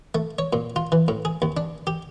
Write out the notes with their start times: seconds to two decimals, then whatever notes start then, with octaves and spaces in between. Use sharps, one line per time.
0.15 A3
0.39 C#5
0.53 A#2
0.76 F4
0.92 E3
1.08 A2
1.25 G#4
1.42 D#2
1.57 D4
1.87 G4